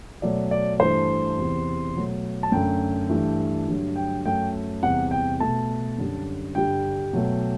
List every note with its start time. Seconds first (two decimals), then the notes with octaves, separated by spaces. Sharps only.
0.22 B2 F#3 A3 D5
0.51 D5
0.79 G2 E3 A3 C5
1.37 E2 C3 E3
1.95 B2 F#3 A3
2.43 A5
2.52 F#2 D3 A3 G5
3.09 G2 E3 A3
3.68 G2 D3 F#3 A3
3.96 G5
4.25 F#2 F#3 A3 G5
4.82 E2 C3 G3 F#5
5.11 G5
5.40 B2 A3 A5
5.98 F#2 D3 G3
6.55 G2 D3 G3 G5
7.13 B2 F#3 A3